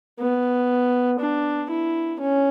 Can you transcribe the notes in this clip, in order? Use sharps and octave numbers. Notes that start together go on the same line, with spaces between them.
B3
D4
E4
C#4